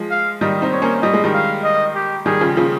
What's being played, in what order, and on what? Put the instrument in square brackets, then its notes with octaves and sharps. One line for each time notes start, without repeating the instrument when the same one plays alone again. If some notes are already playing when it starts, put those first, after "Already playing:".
Already playing: [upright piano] F3 G#3
[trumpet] F5
[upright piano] D#3 G3 [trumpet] D#5
[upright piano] C4 D#4
[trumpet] C#5
[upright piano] A#3 C#4
[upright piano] G3 [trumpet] D#5
[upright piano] G#3
D#3 G3
[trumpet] F5
D#5
G4
[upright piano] D#3 G3 [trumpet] G#4
[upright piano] C#3 F3
C#3 F3